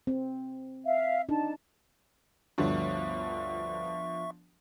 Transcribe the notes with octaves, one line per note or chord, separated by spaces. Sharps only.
C4
E5 F5
D4 D#4 A5
G1 D2 G2 F3 B3 D4 E5 C#6